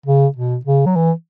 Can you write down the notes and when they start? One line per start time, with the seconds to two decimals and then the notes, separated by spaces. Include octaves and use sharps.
0.06 C#3
0.37 B2
0.65 C#3
0.86 F#3
0.96 E3